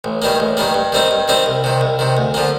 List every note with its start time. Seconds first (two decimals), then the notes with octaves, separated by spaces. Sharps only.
0.04 A1
0.22 G2 D#3 G3 A#3
0.40 A1
0.57 G2 D#3 G3 A#3
0.74 G2
0.92 D#3 G3 C4 D#4
1.11 G2
1.28 D#3 G3 C4 D#4
1.46 C2
1.64 C3 D#3
1.81 C2
1.99 C3 D#3
2.17 D2
2.34 D3 F3 A#3